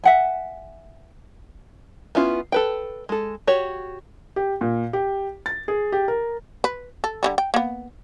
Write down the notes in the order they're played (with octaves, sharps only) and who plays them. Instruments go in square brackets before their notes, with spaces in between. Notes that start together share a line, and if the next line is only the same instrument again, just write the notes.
[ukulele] E5 F#5 G#5
[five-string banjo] B3 C#4 E4 F4
A4 B4 G5
G#3 A4
F#4 G4 C#5
[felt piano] G4
A#2
G4
A6
G#4
G4
A#4
[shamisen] B4
A4
D3 E3 G3
G5
A#3 B3